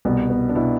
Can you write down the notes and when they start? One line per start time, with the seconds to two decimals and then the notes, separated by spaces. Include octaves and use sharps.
0.05 C2 B2 B3
0.30 B3
0.49 D4
0.55 B2 E4